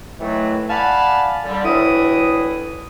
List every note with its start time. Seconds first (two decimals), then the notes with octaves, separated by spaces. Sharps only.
0.19 A2 D#3 E3 F#3 A3
0.69 D5 F5 F#5 G#5 A5 B5
1.45 D3 G3
1.64 D2 A2 E3 E4 D#6